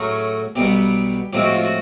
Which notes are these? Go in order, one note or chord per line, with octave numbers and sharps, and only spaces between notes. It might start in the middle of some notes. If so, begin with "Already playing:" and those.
Already playing: A2 F#3 A3 C#4 G#4
B1 B2 G3 B3 G4
A2 F3 G#3 C4 G4
F#4
F4
F#4